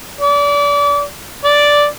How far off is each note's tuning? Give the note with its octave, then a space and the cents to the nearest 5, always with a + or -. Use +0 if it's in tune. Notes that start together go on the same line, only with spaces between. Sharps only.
D5 -30
D5 -5